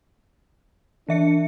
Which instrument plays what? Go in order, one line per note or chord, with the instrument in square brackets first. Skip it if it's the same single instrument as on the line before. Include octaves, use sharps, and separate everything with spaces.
[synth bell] E3 E5 C#7 [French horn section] D4